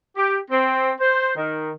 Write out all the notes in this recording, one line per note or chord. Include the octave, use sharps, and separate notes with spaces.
G4
C4
C5
D#3